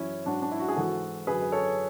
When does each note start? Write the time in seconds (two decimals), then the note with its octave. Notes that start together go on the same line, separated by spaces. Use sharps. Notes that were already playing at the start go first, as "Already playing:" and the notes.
Already playing: F#2 E3 C#4 E4
0.26 G#2 F#3 D4 F#4
0.42 D4
0.51 E4
0.60 F#4
0.68 G#4
0.76 G#2 E3 F#4 A4
1.27 F#2 D3 F#3 G#4 B4
1.42 B4
1.52 A4 C#5